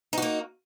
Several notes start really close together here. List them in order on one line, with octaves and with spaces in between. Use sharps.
D#4 F#4 A#3